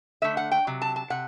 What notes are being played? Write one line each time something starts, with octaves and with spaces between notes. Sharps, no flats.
D3 A3 E5
F#5
G5
C3 F#3
A5
A5
C3 F#5